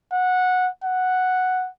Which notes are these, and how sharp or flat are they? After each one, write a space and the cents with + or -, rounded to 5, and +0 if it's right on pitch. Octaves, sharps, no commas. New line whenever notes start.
F#5 -15
F#5 +0